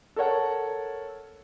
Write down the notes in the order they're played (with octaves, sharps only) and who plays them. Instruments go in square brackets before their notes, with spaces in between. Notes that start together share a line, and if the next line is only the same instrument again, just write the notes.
[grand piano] A4 A#4 C#5 F#5